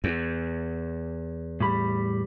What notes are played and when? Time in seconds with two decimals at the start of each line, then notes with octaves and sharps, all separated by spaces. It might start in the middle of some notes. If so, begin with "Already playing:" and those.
0.04 E2
1.60 A2 G3 B5